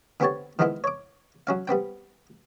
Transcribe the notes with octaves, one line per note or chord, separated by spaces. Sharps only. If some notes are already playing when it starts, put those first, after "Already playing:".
D3 B3 C4 G4 C#5 A5
D#3 F3 G#3 B3 E4 F4
C#5 D6
F#3 C#4 F5
G3 B3 C4 G5